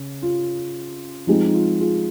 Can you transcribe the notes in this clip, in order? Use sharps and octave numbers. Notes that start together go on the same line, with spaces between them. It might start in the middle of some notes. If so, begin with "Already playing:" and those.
Already playing: C#3
F4
F3 G#3 C4 D#4
D#4
F4
F4 G#4